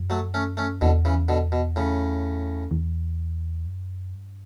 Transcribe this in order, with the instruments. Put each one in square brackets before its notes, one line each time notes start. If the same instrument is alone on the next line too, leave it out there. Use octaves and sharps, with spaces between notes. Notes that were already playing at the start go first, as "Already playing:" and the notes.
Already playing: [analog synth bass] F#2
[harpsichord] F#3 A3
A3 C#4
A3 C#4
[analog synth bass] E2 [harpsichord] B2 D3
[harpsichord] C#3 E3
B2 D3
B2
A2 C#3
[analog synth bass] E2
F#2
G2